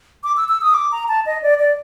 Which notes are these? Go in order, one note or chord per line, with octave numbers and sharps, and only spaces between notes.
D6
E6
E6
D#6
D6
A#5
A5
D#5
D5
D5